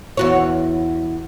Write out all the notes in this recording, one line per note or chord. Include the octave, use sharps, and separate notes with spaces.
E2 F#4 C#5